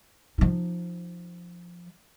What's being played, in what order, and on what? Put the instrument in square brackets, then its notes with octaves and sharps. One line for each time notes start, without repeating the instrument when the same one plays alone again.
[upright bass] F3 D#4